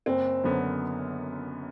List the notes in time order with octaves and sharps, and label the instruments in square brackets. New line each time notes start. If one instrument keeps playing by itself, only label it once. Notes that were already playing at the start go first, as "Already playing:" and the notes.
[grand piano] F#1 [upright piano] C4
[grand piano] F#2 D3 F#3 B3